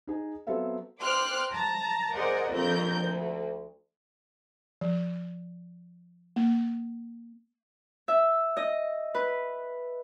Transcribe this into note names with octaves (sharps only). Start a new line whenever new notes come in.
D#4 G#4
F#3 B3 C4 A4 E5 F5
C5 G5 C6 D6 F6 F#6
A5 A#5
G#4 A#4 C5 D5 D#5 F#5
A#1 F2 F3 C4 A#4 G6
D2
F3
A#3
E5
D#5
B4